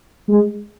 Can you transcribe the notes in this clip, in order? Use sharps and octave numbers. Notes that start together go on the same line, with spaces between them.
G#3